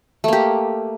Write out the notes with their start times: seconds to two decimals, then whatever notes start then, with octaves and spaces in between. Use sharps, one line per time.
0.24 A3
0.28 A#3
0.33 G4